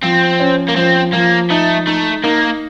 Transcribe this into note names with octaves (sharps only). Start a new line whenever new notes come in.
F3 C4
C#4
A#3
F3 C4
F3 A#3
A3 D#4
A3 D#4
A#3 D#4